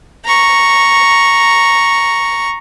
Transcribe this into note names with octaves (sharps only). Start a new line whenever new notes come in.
A#5 C#6